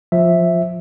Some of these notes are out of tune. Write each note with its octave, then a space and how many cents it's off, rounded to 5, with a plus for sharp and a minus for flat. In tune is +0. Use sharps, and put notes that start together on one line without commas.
F3 +10 E5 +0